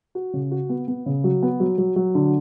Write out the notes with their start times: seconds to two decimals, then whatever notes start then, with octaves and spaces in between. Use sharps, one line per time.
0.15 F#4
0.34 C#3
0.51 F#4
0.69 B3
0.88 B3
1.06 C#3
1.24 F#3
1.43 B3
1.60 F#3
1.78 F#3
1.96 F#3
2.15 D3